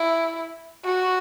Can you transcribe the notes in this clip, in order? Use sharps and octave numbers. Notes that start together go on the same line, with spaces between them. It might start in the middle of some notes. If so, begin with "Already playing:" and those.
Already playing: E4
F#4